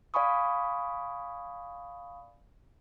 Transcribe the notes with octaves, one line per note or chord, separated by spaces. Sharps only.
D5 F5 G#5 B5 C#6 D#6